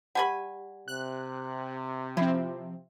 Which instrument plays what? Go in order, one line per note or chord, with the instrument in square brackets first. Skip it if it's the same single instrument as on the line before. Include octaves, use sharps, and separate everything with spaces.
[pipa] G3 G#5 B5 [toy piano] G4 F#5
[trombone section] C3 [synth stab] F#6
[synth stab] F3 C4 [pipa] E4